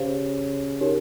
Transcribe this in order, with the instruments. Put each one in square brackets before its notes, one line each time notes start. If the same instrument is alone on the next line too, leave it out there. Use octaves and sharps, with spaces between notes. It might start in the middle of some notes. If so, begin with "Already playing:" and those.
Already playing: [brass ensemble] C#3 C#4 [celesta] G4 C5 F5
[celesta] D#4 G4 A#4 C#5